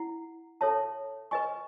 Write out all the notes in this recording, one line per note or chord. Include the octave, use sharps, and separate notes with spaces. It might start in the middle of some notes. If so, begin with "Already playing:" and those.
Already playing: E4 F#5
A4 C#5 E5 A5
B4 D#5 G#5 C#6